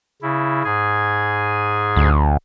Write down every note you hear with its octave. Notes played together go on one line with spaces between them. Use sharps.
C#3 E4
G#2 G#4 G#5
D2